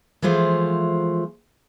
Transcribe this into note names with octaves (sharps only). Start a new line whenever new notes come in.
E3 F3 G#3 A3 F4 C5